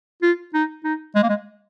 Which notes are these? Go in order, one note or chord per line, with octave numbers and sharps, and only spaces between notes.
F4
D#4
D#4
G#3
A#3
G#3